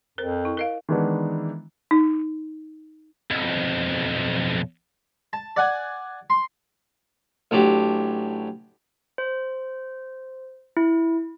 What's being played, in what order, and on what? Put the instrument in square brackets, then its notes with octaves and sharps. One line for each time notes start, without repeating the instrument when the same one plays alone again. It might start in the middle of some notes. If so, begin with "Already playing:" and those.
[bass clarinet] F2 [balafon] A#4 C5
[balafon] E4
A#4 D#5 F5
[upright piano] D#3 E3 G#3 B3 D4 E4
[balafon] D#4
[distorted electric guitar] B1 F2
[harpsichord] A5
D5 F#5 G#5
C6
A1 F#3 D4 G4
[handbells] C5
E4